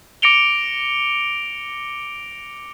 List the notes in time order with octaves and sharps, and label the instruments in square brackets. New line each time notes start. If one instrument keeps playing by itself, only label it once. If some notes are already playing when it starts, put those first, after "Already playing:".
[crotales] D6 A#6 C#7 D7 F7 G7